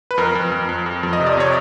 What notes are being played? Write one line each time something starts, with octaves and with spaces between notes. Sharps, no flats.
B4
F2 A#4
F2
F2
F2
F2
F2
D#5
C3
D5
C3 C#5